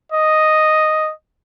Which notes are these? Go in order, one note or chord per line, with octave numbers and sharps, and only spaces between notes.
D#5